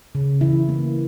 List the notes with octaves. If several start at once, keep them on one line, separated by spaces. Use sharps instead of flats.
C#3
E3 E4
A#3